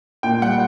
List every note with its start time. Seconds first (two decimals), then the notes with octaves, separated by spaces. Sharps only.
0.23 A#2 G5
0.42 G3 F#5